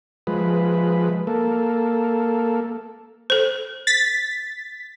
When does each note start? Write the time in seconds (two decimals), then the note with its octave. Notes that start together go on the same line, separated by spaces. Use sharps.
0.27 F3 G#3 B4
1.27 A#3 A4
3.30 A4 C5
3.87 A6 B6